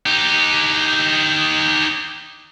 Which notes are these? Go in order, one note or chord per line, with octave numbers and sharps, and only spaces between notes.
D#4 G4